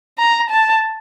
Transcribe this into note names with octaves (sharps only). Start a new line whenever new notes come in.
A#5
A5